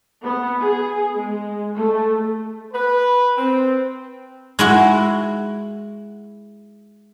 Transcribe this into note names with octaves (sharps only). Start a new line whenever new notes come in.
B3
G#4
G#3
A3
B4
C4
G#3 E4 F#4